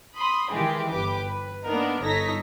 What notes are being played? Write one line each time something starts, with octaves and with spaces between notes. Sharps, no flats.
B5 C6 D#6
D#3 E3 G#3 G4 G#4
G1 G4 B4 D6
B4
A#3 B3 D4 D#4 A#4
G1 D#4 A4 C#5 A#6 B6